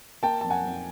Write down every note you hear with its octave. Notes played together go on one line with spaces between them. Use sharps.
A#3 G5 A5
F2 A5
F#5 G#5
F2